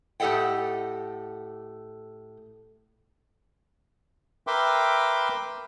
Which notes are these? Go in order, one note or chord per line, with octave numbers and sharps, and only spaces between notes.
A2 G4 A4 D#5 F#5 G5
A#4 B4 E5 G5 C6 D6